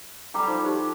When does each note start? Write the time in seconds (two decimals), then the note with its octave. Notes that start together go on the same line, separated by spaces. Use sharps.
0.34 G3 G4 A4 G5 A#5 D6
0.48 F3 D#4
0.64 D#4 G4 C5